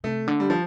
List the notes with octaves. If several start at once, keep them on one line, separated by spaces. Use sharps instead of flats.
C3 A3
D3
G3
F3